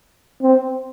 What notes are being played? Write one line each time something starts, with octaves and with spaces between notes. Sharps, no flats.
C4